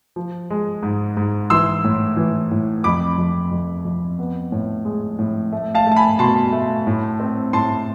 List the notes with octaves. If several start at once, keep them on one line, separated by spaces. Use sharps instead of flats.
F3
G#3
G#2
G#2
E3 C6 E6
A2
E3
A2
F2 B5 D6
F2
F2
F2
B3
A2
G#3
A2
A3
F5 A5
A3
A5
G#5 B5
B2 A5 C6
A3
A2
C4
A2 A5 C6